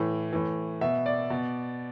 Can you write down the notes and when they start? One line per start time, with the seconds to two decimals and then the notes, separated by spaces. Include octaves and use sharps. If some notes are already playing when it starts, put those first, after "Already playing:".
Already playing: A2 E3
0.33 A2 E3
0.81 B2 E5
1.06 D5
1.30 B2